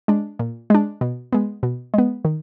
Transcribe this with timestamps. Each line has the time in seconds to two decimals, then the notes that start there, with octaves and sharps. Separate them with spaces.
0.08 G#3 D4
0.39 A#2
0.70 G#3 D4
1.01 B2
1.33 G#3 B3
1.63 B2
1.94 G#3 B3
2.25 D#3